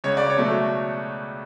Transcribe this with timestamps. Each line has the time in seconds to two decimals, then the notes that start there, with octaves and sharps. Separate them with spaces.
0.04 C#2 C#5
0.17 D5
0.30 C#5
0.37 B2 F#3 A3